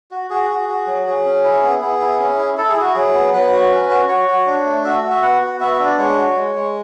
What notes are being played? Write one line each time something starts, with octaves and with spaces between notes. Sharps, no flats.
F#4
F#4 G#4
F#4
F#4
F#3
F#3 G#4
C#4
E4
B3
B3 G#4
E4
C#4
E4
E4 A4
G#4
E4 F#4
F#3 G#4
B3
F#3 B4
F#4
C#4
F#4
F#4 C#5
F#4
D4
A3
F#4 E5
F#4
E5
B3 F#5
F#4
B3 E5
E5
D4
D5
G#3 C#5
F#4
G#3
G#3